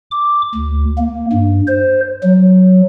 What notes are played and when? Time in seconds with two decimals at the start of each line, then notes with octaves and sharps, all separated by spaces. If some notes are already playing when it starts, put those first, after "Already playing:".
0.11 D6
0.55 D2
0.98 A#3
1.33 G2
1.67 C5
2.23 F#3